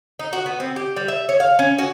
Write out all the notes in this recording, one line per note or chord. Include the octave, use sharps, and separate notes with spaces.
D#4
F#4
B3
C4
G4
G3
E5
C#5
F5
C#4
F#4